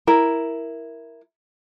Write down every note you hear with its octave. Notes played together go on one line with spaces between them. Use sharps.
E4 A#4